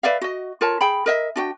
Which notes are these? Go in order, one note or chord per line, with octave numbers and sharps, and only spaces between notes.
B4 D5 E5 F5
F#4 D#5
F4 A#4 C#5 A5
G#4 G5 B5
A#4 D#5 E5
D4 F#4 G5